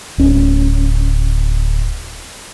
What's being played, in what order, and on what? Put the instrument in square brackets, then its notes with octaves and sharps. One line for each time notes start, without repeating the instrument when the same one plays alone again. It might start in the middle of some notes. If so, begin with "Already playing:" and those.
[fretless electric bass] D1 C#4